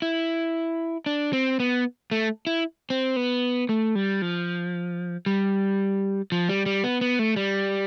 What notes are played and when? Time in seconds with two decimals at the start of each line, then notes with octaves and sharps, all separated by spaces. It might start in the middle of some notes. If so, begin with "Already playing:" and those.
0.02 E4
1.06 D4
1.33 C4
1.60 B3
2.11 A3
2.47 E4
2.90 C4
3.16 B3
3.69 A3
3.95 G3
4.22 F3
5.26 G3
6.32 F3
6.49 G3
6.66 G3
6.84 B3
7.01 B3
7.19 A3
7.36 G3